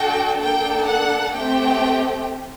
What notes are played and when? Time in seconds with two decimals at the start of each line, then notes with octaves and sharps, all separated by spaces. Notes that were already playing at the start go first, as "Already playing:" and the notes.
Already playing: D4 F#4 A4 G5
0.41 A#3 D4 A4 G5
0.87 F#5
1.35 A3 C4 G4 G5